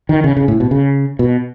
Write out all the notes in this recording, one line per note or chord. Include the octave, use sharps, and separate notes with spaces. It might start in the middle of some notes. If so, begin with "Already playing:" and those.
D#3
C#3
C#3
A2
B2
C#3
B2